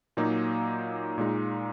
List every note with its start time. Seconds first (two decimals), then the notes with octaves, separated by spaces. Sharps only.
0.17 A#2 F#3 A#3 D#4
1.18 A#2 G#3 D#4